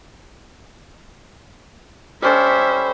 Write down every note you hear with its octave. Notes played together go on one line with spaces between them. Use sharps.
G3 C#4 A4 C5 E5